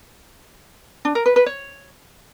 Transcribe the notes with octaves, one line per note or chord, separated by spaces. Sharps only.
D4
A#4
B4
B4
C#5